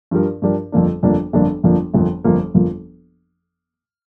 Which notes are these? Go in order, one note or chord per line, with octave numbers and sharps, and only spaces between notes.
G2 F3 D4 G4 A#4
G2 F3 D4 G4 A#4
G1 F2 F3 A#3 D4
G1 F2 F3 A#3 D4
G1 F2 F3 A#3 D4
G1 F2 F3 A#3 D4
G1 F2 F3 A#3
G1 F2 F3 A#3
G1 F2 F3 A#3